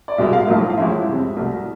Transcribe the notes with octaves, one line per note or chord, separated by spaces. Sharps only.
D5
C2 B2 G#3 E5
F5
B1 A2 F3 A3
F5
A1 A2 F3 G#3 E5
F2 C3 G#3
C2 B2 A3